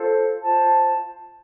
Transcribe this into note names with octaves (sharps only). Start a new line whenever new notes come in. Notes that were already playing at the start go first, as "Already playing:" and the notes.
Already playing: F4 A4 C5
F4 C5 A5